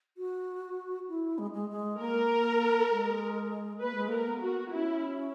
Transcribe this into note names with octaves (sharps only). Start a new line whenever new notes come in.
F#4
E4
G#3
G#3
G#3
A#3 A#4
G#3
A#3 B4
G#3
A#3 A#4
B3
F#4
C#4 E4